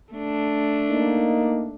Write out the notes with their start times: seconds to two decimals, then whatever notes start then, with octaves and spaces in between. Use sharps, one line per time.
0.13 A3 D4
0.90 A#3 D#4